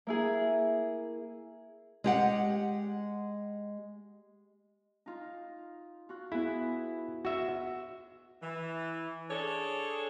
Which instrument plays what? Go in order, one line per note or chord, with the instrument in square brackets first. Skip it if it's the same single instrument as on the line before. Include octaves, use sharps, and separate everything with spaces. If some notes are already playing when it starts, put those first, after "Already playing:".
[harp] A#3 E4 G#4
[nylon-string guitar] G#3 G4 F#5
[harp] D#4 F4
F4 F#4
[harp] B3 G#4 [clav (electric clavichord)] E4
[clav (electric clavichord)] F#4 E5
[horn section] E3
D4 G#4 A4 C#5